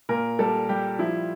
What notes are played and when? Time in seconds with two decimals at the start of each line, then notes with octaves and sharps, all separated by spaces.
0.09 A#2 A#4
0.39 G3 A4
0.69 G3 G4
0.99 F3 E4